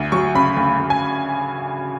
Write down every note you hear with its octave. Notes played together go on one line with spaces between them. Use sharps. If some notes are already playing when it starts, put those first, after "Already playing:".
Already playing: D2
F#3 C#6
C#3 B5
D2
D2
G#5